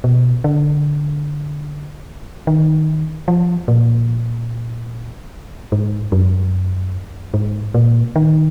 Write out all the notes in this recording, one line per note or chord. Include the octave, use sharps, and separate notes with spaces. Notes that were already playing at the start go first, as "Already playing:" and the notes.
B2
D3
D#3
F3
A#2
G#2
F#2
G#2
A#2
D#3